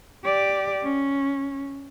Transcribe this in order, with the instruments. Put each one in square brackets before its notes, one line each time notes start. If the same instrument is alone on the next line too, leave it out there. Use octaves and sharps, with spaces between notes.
[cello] G4 D5
C#4